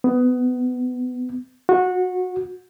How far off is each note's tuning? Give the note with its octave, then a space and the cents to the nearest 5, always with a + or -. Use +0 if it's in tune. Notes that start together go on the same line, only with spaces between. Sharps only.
B3 +20
F#4 -20